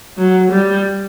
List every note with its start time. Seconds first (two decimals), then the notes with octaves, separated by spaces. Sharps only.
0.17 F#3
0.52 G3